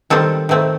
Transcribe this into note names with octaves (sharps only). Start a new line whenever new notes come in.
D#3 G3 C4 A4
D#3 A3 C4